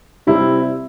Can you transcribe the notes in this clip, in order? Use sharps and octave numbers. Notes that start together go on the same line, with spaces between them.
C3 G3 C4 E4